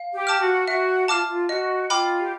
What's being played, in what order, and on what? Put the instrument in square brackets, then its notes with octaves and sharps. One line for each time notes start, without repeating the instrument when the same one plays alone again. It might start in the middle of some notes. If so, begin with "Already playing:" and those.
Already playing: [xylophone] F5
[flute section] G4
[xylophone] A5 D6 F6
[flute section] F#4
[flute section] F#4 [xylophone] E5
[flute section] F4 [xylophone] A5 D6 F6
[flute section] F4
[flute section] F#4 [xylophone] D#5
[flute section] F4 [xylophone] G5 B5 D6 F6
[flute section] G4